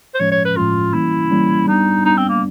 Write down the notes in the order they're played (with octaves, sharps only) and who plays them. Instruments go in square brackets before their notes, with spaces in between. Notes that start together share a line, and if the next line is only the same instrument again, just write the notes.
[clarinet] C5
[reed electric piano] A2 F3 G#3 C#4 [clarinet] C#5
[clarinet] C#5
B4
[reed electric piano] A2 F3 G#3 C#4 [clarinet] F4
[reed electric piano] E3 G3 A#3 C#4 [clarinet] E4
[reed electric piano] E3 G3 A#3 C#4
[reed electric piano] G3 B3 D4 [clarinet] D#4
[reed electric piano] G3 B3 D4 [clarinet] D#4
[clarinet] C4
A#3